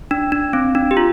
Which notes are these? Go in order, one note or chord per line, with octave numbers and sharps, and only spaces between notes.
D4
D4
C4
D4
G4
F4